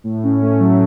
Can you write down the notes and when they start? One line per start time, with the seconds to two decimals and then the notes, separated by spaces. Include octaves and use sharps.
0.04 A2
0.23 C#4
0.42 A3
0.60 F#3